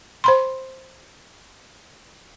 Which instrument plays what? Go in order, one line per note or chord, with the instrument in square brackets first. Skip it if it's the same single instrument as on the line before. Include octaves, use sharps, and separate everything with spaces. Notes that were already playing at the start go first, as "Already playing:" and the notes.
[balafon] C5 B5 C6